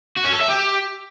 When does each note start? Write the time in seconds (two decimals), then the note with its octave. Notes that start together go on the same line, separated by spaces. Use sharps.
0.17 F#4
0.25 C#4
0.33 A4
0.42 E5
0.50 G4